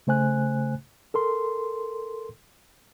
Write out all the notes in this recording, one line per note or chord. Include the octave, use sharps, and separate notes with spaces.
C#3 A3 C5 G#5 F#6
A4 A#4 C6